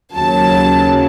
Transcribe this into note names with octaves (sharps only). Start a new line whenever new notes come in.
D#2 C#3 F#3 A5